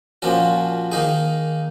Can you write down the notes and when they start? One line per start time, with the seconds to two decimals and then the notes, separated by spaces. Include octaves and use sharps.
0.22 A#2 F3 A#3 C#4 F#4
0.92 D#3 A#3 D#4 G#4